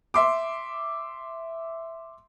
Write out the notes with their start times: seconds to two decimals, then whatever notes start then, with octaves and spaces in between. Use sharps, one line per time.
0.14 E5 C6 D6